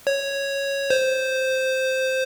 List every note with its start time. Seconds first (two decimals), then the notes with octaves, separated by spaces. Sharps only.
0.07 C#5
0.90 C5